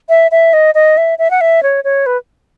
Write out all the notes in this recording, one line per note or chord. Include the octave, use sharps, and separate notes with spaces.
E5
E5
D#5
D#5
E5
E5
F#5
E5
C#5
C#5
B4